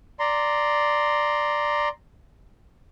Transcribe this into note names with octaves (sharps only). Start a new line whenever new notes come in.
D5 A#5 C6